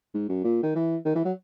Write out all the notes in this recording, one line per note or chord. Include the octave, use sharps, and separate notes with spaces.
G#2
F#2
A#2
D#3
E3
D#3
E3
F#3